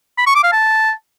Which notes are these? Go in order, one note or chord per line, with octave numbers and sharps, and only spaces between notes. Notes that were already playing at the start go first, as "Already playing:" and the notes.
B5
C#6
D6
F5
A5